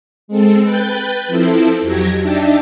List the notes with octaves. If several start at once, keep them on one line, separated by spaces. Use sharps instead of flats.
G#3 C4 A4
B4 G5 F#6 G6 A6
F3 C4 E4 A4
F2 F#3 G4 G#6 A#6
D4 D#4 D5 E5 G5 A5